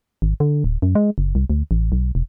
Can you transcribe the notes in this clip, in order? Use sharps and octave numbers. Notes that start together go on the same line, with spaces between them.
G#1
D3
D1
F#2
G#3
F#1
C2
D2
A1
B1
E1